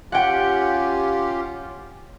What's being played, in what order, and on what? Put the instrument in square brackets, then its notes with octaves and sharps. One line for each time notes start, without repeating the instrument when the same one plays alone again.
[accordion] C#4 F4 G4 [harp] F#5 G5